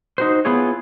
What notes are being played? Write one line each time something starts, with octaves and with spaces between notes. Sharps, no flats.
D#4 F#4 C5
B3 E4 F4 G#4 C#5